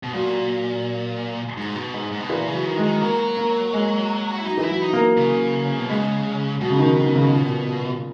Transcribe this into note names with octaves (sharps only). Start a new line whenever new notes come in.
B2
A#2 F#3
G#2
B2
G#2
G#2
B2
A#2 E3
C#3
F#3
D#3
G#3
D#3
F#3 A#3
A#3
G#3
F#4
E4
F#3 D#4
E3
E4
F#3
D#4
A#3
C#3
B2
C#3 G#3
B2 F#3
C#3
D#3
D#3
C#3
A#2